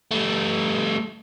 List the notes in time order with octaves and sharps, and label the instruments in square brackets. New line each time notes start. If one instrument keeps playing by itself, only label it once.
[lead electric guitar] G3 A3